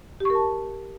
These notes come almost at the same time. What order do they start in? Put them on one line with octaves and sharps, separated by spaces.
G4 C#6 A#4 A5